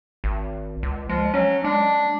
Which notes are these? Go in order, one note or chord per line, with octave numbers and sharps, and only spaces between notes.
G#1
C#2
F3 G#3
F#3 C#4
G#3 D4